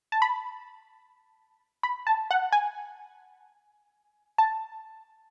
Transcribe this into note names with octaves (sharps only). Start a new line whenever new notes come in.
A5
B5
B5
A5
F#5
G#5
A5